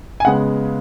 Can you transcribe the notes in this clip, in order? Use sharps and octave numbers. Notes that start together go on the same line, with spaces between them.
G#5
C#3 G#3 B3 F#5